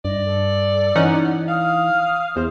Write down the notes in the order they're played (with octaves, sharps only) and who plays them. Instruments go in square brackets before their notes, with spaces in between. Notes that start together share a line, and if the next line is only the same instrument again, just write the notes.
[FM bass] G2 [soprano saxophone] D5 [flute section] D#5
[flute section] A4
[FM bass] E3 [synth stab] C#4 D#4 F#5
[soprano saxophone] F5 [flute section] D#6 F6
[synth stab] E2 [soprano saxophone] C5